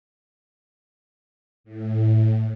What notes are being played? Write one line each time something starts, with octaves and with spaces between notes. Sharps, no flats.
A2